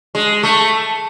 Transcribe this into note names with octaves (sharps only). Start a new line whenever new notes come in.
G#3
A3